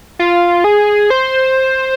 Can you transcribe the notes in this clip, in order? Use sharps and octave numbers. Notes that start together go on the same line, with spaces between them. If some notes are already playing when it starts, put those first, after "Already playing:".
F4
G#4
C5